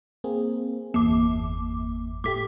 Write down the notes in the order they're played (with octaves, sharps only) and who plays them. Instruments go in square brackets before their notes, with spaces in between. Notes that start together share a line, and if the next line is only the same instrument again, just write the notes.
[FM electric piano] A#3 C4 G#4
[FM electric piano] G1 E2 [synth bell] A#3 D6
[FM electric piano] A2 A3 G4 [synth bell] D6 B6